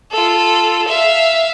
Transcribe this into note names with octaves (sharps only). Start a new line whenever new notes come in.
F4 A4
E5 F5